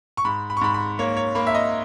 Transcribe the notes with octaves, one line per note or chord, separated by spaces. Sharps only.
C#6
G#2 B5
B5
C#6
G#2 B5
B5
A#3 C#5
C#5
A#3 B5
E5
D#5